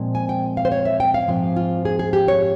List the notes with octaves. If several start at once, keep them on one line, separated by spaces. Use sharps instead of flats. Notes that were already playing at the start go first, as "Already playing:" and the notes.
Already playing: A#2 F3 G#3 C4
G#5
G5
F5
C5
C#5
E5
G5
F5
G#2 F3 C4
F4
G#4
G#4
G4
C#5